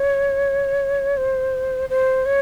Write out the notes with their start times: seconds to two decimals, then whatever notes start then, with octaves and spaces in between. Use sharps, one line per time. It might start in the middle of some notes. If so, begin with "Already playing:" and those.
Already playing: C#5
1.17 C5
1.90 C5
2.26 C#5